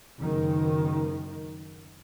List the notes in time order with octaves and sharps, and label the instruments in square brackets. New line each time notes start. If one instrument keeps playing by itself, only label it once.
[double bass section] F#1 D#3